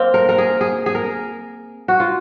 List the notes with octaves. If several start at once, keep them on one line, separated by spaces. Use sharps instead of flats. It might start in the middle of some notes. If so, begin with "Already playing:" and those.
Already playing: A#3 C4
A#4
A#4
G#4
G#4
G#4
A#4
F#4
F4